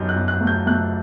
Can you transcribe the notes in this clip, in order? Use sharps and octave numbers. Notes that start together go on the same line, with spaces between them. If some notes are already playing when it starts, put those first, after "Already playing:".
Already playing: F#2 F#3 D#4 G6
F#6
F#2
F#6
A3
G6
A3 F#6